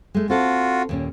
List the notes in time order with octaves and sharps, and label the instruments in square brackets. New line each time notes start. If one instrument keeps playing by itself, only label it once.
[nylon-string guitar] G#3 A3
[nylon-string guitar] C4 A4 [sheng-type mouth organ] F4 F#4
[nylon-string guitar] D#2 A#2 C#4